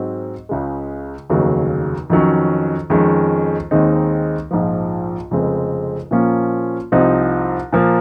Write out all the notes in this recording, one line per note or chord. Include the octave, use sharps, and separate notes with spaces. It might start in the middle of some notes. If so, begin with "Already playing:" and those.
Already playing: G#2 F#3 C4
C#2 C#3 G#3
F1 D#2 C#3 F#3
F2 D#3 F#3 C#4
F2 D#3 G#3 C#4
D#2 D#3 G#3 C4 D#4
A#1 G#2 F3
F1 F2 C#3 G#3 C4
A#2 F3 A#3 C#4 F4
C2 C3 F3 C4 D#4
A#2 F3 A#3